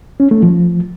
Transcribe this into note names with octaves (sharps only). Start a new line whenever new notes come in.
C#4
A3
F3